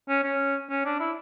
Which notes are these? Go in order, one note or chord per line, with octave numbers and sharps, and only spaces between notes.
C#4
C#4
C#4
D4
E4